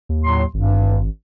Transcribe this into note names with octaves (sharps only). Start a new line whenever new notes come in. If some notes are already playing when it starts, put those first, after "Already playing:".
D#2
A2 F#3 C6
G#1 G2